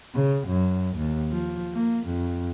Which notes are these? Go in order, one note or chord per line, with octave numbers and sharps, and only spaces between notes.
C#3
F#2
D#2
F3
A#3
F2